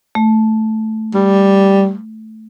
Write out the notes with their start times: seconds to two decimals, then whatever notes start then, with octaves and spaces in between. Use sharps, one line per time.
0.15 A3
1.14 G3